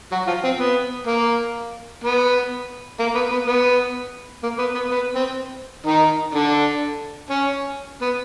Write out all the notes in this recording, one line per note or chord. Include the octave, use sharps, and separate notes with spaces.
F#3 F#4
F3 F4
C4
B3
A#3
B3
A#3
B3
B3
B3
A#3
B3
B3
B3
C4
D#3 D#4
D3 D4
C#4
B3